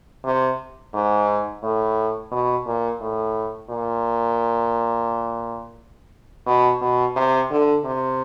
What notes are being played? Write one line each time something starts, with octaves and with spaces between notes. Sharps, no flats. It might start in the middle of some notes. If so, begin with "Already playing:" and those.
C3
G#2
A2
B2
A#2
A2
A#2
B2
B2
C3
D3
C3